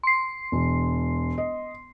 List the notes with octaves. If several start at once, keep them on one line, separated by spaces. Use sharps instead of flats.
C6 C7
E1
D#5